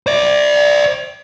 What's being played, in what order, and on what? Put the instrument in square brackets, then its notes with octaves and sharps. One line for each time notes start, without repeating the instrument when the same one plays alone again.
[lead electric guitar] C5 D5